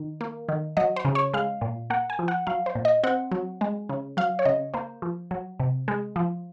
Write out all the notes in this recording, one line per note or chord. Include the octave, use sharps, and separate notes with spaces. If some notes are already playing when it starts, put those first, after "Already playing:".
Already playing: D#3
A#3
D#3
F#3 D#5
C5
C#3
C#5
G#3 F5
A#2
A#3 F#5
G#5
F3
F#5
F#3 F5
C5
A#2
D#5
C4 F#5
F#3
G#3
C#3
F#3 F5
C#5
C#3 D#5
A#3 C5
F3
F#3
C3
G#3
F3